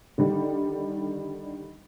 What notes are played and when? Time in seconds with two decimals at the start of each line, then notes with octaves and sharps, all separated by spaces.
0.18 D3 D#3 G3